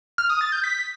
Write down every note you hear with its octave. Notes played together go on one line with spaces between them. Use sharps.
F6
D#6
A6
G6
B6